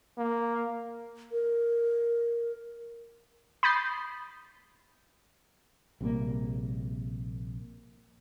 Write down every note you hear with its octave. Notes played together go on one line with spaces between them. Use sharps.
A#3
A#4
B5 D#6 G6 A6 C7
A#1 C3 G3 A#3